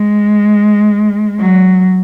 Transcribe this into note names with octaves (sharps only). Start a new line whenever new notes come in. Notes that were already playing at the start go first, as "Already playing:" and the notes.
Already playing: G#3
F#3